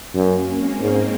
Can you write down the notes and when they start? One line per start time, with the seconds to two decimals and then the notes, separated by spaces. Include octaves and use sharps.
0.15 F#2 A#3 C#4
0.47 G#3 C4
0.81 G#2